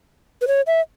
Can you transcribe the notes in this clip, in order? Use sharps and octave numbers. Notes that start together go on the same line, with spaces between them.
B4
C#5
E5